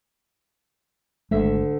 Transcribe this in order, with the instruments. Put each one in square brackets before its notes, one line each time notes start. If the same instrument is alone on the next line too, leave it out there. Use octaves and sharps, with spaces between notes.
[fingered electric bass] G#1 G#3 A3 [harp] D2 E5 B6